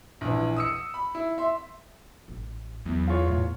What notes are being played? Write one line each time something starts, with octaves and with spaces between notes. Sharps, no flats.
A#1 E3
D#6 E6 C#7
B5
E4
E5 C6
A1
E2 F#3 C4
F4 C#5
A2